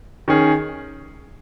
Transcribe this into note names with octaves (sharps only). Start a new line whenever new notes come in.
D#3 C#4 G#4